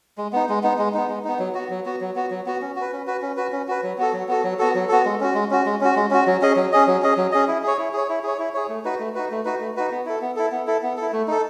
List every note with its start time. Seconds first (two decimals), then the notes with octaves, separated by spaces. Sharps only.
0.18 G#3
0.33 B3 D#4
0.49 G#3
0.63 B3 D#4
0.79 G#3
0.94 B3 D#4
1.09 G#3
1.24 B3 D#4
1.39 F#3
1.54 B3 F#4
1.70 F#3
1.85 B3 F#4
2.01 F#3
2.16 B3 F#4
2.31 F#3
2.46 B3 F#4
2.62 C#4
2.76 F#4
2.81 B4
2.92 C#4
3.07 F#4 B4
3.22 C#4
3.37 F#4 B4
3.52 C#4
3.68 F#4 B4
3.83 F#3
3.98 B3 F#4 A4
4.13 F#3
4.28 B3 F#4 A4
4.44 F#3
4.59 B3 F#4 A4
4.75 F#3
4.89 B3 F#4 A4
5.05 G#3
5.20 C#4 F#4
5.34 G#3
5.51 C#4 F#4
5.66 G#3
5.81 C#4 F#4
5.96 G#3
6.11 C#4 F#4
6.27 F#3
6.41 C#4 G#4 D#5
6.56 F#3
6.72 C#4 G#4 D#5
6.87 F#3
7.02 C#4 G#4 D#5
7.17 F#3
7.32 C#4 G#4 D#5
7.48 E4
7.63 G#4 C#5
7.79 E4
7.93 G#4 C#5
8.09 E4
8.23 G#4 C#5
8.39 E4
8.54 G#4 C#5
8.69 A3
8.85 D#4 F#4 B4
8.99 A3
9.15 D#4 F#4 B4
9.31 A3
9.45 D#4 F#4 B4
9.60 A3
9.77 D#4 F#4 B4
9.91 B3
10.06 E4 A4
10.21 B3
10.36 E4 A4
10.52 B3
10.67 E4 A4
10.83 B3
10.97 E4 A4
11.13 A3
11.28 D#4 A4